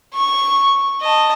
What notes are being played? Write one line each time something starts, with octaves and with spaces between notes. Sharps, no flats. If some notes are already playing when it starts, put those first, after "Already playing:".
C#6
D#5 A5